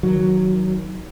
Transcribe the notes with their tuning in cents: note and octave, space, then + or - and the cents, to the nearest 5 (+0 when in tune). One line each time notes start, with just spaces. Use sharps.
D#3 +25 F#3 +0